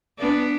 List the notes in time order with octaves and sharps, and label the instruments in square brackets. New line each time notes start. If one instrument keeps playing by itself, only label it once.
[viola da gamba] B3 D4